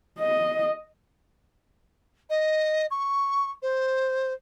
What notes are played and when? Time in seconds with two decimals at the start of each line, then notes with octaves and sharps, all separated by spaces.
0.19 D#5
2.30 D#5
2.91 C#6
3.62 C5